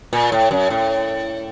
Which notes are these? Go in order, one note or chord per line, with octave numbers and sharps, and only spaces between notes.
A#2
A2
F#2
A2